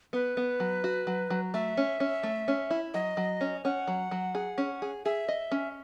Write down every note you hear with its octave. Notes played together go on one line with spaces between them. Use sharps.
B3 B4
B3
F#3
F#4
F#3
F#3
A3 E5
C#4
C#4
A3
C#4
E4
F#3 D#5
F#3
C#4
C#4 F#5
F#3
F#3
G#4
C#4
G#4
G#4 E5
D#5
C#4